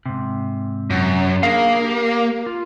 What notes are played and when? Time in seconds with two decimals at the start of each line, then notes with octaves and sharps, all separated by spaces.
0.06 G#2 C3
0.90 F#2
1.43 A#3 D4 G#4 F5
1.84 G4
2.46 F4